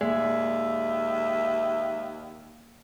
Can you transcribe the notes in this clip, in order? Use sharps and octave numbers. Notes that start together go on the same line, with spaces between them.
D#2 G#3 A#3 D5 E5